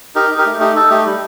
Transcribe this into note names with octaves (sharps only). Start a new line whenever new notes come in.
D#4 G4 A#4
D#4
G4 A#4
A3
D#4 G4
D#4 A4
A3 G4
G3